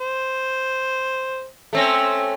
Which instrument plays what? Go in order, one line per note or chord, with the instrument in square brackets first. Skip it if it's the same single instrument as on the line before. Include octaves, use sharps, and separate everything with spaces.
[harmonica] C5
[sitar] A3 C4 C#4